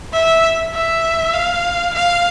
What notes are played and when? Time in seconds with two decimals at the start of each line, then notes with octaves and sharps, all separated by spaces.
0.14 E5
0.74 E5
1.34 F5
1.94 F5